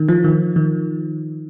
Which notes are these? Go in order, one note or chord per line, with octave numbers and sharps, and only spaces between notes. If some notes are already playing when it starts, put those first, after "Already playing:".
Already playing: D#3
F3
D#3
D#3